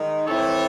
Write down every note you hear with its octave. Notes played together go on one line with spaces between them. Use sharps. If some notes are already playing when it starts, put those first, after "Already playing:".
Already playing: D#3 G#3 D#4
E3 C4 E4 A4 C#5